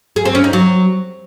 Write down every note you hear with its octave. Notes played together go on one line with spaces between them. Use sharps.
G#4
C4
C#4
D#4
F#3